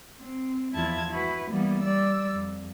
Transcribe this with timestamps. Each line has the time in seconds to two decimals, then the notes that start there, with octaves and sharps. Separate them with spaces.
0.19 C4
0.75 E2 F3 E4 F4 A5 G#6
1.10 E4 F#4 B4
1.50 E3 G3 A#3 B3
1.81 G3 D5 E6
2.31 F2